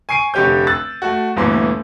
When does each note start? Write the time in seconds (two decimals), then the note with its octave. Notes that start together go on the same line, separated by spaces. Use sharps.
0.09 G#5 C#6 C7 D7 D#7
0.34 F1 D3 G4 C#5 G6
0.67 E6 F#6 A6
1.02 A3 F#4
1.36 G1 D2 A#2 E3 C6 D6